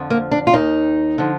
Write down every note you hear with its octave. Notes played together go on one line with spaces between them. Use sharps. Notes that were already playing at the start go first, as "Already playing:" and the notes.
Already playing: F2 D3 F3
A#3
D4
F4
D#2 D#3 D#4
D3 F3